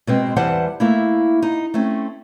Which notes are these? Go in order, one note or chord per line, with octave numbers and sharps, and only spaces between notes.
B2 G#3 C4
E2 E3 G3 C5 F#5 A5
A3 A#3 E4
D#4
A3 C4 C#4